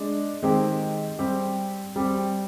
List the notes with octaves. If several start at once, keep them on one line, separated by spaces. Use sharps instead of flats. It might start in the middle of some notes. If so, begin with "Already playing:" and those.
Already playing: G#3 D4
D#3 G#3 C4 G4
G3 C4 G4
G3 C4 G4